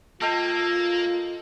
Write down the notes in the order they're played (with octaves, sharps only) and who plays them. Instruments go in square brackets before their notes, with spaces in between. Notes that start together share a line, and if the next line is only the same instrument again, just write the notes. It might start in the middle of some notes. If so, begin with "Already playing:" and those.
[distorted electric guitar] A#3 [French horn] F4 [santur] A4 D#5 G5